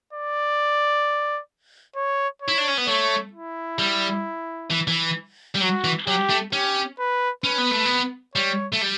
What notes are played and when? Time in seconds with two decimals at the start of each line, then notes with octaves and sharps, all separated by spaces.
0.13 D5
1.96 C#5
2.42 C#5
2.48 E4
2.58 D4
2.68 C#4
2.78 B3
2.87 A3 C#5
3.33 E4
3.79 G3
4.71 E3
4.88 E3
5.55 G3
5.61 F#3 F#4
5.84 E3
6.07 F#3 G4
6.30 A3
6.53 C#4 G4
6.99 B4
7.44 C#4 B4
7.58 B3
7.71 A3
7.86 B3
8.35 G3 C#5
8.72 A3
8.81 G3